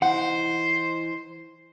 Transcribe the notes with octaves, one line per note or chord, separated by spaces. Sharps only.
E3 D#4 C5 F#5